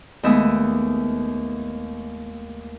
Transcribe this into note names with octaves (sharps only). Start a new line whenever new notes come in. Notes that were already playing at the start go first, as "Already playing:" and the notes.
D#2 G#3 A3 B3 E5 D#6